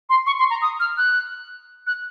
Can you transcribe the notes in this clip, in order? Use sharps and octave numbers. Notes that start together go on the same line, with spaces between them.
C6
C#6
C6
A#5
D#6
F6
F#6
F#6